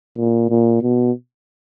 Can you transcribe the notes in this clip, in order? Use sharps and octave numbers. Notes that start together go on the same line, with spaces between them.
A#2
A#2
B2